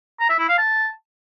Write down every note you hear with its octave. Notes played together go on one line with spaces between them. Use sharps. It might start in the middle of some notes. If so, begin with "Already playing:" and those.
A#5
E5
E4
F5
A5